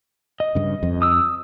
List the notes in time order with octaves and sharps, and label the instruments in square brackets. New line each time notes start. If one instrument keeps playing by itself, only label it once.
[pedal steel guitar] D#5
[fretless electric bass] G2 C#3
F2
[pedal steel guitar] D#6 E6